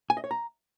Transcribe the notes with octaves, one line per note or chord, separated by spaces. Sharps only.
G#5
D#5
C#5
A#5